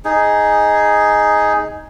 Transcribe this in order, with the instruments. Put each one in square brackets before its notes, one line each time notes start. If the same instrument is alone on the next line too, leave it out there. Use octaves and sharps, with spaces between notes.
[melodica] D#4 G#4